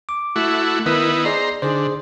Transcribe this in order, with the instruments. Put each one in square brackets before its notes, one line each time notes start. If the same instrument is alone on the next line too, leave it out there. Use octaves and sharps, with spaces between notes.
[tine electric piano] D6
[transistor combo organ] A3 E4 F#4
[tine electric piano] D#3 B4 [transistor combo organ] B3 D#4 E4
[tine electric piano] G#4 D5 D#5 [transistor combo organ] C5 A#5
[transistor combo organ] D3 [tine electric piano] D#4 G#4 C5